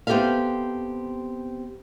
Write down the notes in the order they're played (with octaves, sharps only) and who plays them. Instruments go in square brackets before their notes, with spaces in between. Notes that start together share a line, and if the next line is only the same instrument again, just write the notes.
[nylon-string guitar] B3 C4 G4 A4 E5 F5